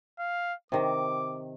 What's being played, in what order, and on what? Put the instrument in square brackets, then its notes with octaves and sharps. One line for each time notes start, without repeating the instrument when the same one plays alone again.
[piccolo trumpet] F5
[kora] C3 D#3 [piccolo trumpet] D6